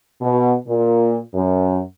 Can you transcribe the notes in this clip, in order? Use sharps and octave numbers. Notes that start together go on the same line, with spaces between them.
B2
A#2
F#2